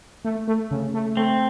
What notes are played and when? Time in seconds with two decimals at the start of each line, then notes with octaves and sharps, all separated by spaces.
0.25 A3
0.48 A3
0.71 C#3
0.94 A3
1.17 A3 C4